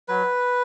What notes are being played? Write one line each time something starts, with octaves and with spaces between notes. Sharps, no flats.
F#3 B4